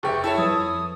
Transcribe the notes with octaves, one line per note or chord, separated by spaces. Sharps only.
F1 G4 G#4 B4 E5 C#6
E4 A4 C#5 A5
F2 B4 D#6